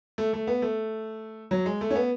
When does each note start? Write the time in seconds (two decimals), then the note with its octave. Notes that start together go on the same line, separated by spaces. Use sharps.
0.18 A3
0.33 A3
0.47 B3
0.62 A3
1.51 F#3
1.66 G#3
1.81 A3
1.91 C#4
1.96 B3